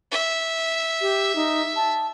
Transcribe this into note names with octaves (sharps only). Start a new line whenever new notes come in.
E5
G4
D#4
A5